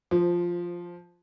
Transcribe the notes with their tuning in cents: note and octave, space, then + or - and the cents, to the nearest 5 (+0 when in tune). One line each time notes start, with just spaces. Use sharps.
F3 +0 C5 -15